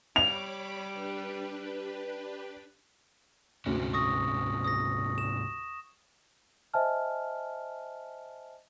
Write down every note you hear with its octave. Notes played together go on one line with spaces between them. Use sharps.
G3 C#5 B5 D6 F7
D4 G4 B4
D2 G#2 C3 C#4
C#6 D#6 A#6
D#6 A#6
E7
C5 D#5 E5 G#5 A5 F6